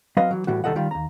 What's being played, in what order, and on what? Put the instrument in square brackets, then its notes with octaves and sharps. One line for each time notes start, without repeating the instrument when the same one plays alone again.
[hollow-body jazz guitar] F#3 C4 B4 D#5 F5
E3 F#3
A2 E3 G3 F#4
C2 D#3 G3 A4 D#5 F#5
D#3 G3 F4
D#2 A#5